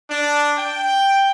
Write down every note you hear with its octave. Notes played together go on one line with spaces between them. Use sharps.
D4
G5